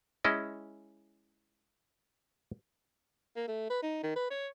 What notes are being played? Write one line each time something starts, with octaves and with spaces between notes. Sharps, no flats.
G#3 C#4 E4 D#5
A#3
A3
B4
D#4
D#3
B4
C#5